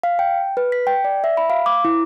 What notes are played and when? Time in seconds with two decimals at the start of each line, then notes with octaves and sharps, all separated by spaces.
0.03 F5
0.19 G5
0.57 B4
0.72 B6
0.87 G5
1.05 D5
1.24 E5
1.37 B5
1.50 F5
1.66 D6
1.85 E4